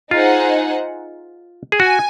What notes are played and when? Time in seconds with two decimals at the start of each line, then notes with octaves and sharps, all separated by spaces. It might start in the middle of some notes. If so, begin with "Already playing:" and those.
0.11 D#4 F4 G#4 C5 F#5
1.72 G#4
1.79 F#4 G#5